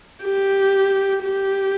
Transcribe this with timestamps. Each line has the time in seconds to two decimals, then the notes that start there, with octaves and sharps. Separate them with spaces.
0.23 G4
1.23 G4